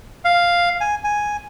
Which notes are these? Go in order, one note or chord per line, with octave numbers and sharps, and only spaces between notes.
F5
G#5
G#5